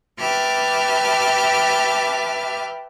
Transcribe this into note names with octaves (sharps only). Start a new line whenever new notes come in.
G4 B4 E5 A5 D6 F6